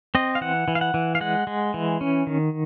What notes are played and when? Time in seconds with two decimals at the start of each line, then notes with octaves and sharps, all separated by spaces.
0.15 C4 D#5
0.35 F5
0.41 E3 F#5
0.68 E3
0.75 F5
0.81 F#5
0.94 E3
1.15 F5
1.21 G#3 F#5
1.47 G#3
1.74 E3
2.01 C#4
2.27 D#3